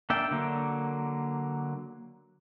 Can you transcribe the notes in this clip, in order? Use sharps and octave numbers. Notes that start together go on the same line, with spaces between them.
A#3 D4 D5 E5 G5
D3 F#3 A#3